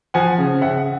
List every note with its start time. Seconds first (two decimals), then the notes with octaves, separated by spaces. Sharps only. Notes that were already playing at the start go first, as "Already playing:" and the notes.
0.14 F3 F#5 G#5
0.38 C#3
0.61 C#3 E5 F#5